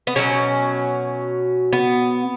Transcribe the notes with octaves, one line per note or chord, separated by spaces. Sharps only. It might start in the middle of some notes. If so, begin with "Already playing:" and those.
B3
B2 F#3 C#4
B3